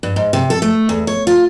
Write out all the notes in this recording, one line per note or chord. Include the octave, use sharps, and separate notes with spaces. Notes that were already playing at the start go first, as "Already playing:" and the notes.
G2
G#2
C3
A4
A3
E2
C#5
F4